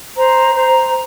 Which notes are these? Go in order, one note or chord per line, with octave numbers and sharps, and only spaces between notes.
C5 A#5
C5 A#5